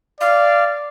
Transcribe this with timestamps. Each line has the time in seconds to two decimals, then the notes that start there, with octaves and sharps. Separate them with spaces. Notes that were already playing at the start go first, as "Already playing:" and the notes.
0.21 D5 F5